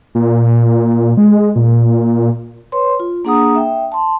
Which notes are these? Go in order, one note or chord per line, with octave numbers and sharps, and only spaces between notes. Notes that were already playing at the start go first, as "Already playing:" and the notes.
A#2
G#3
A#2
B4 C#5 C6
F4
A#3 D4 G#4 F#5 A#5 D#6
E5 G5
A5 C6